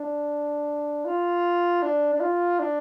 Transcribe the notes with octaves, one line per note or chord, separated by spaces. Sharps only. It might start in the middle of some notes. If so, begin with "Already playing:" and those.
Already playing: D4
F4
D4
D4
F4
D4